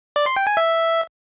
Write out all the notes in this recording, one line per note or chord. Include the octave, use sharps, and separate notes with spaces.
D5
C6
G5
G#5
E5